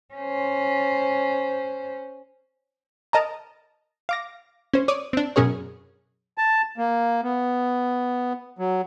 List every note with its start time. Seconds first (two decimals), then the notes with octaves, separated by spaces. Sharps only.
0.15 C#4 C5
3.13 A#4 D#5 A5 A#5
4.09 F5 D6 A#6
4.74 C#4 C5
4.88 C#5 D5 D6 D#6
5.13 C4 D4
5.36 F#2 B2 C#4 G#4 A#4 C#5
6.38 A5
6.78 A#3
7.23 B3
8.59 F#3